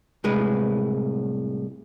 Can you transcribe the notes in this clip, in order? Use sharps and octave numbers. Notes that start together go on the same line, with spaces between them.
C2 A2 G#3 B4